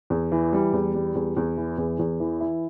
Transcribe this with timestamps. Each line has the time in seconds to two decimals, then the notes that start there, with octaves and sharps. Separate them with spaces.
0.10 E2
0.32 E3
0.53 G3
0.73 E2
0.94 G3
1.15 E2
1.37 E2
1.57 E3
1.78 E2
1.99 E2
2.20 E3
2.41 E4